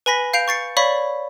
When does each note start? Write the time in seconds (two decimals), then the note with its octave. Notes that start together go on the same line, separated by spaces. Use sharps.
0.06 B4 G#5 B5 A#6 B6
0.34 F5 G6 C7 D7 F7
0.48 C#6 A6 C7 C#7
0.77 C#5 D5 F5 B5 C#6 B6